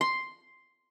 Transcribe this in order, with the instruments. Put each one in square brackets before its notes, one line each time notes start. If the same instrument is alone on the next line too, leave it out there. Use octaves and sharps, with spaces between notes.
[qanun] C6